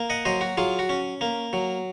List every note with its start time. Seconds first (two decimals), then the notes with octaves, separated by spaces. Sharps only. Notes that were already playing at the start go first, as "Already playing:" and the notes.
Already playing: A#3
0.10 D#5 F#5
0.25 F#3 C5 D#5
0.41 F#4
0.57 F#3 F4 G#4
0.79 F#4
0.89 C#4
1.21 A#3
1.53 F#3